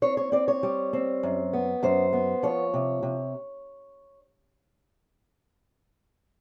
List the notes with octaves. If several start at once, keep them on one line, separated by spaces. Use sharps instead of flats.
C4 C#5
C#5
C4 D5
C#5
G3
C4
F#2
B3
F#2 C5
B3
F3 C#5
C3
C3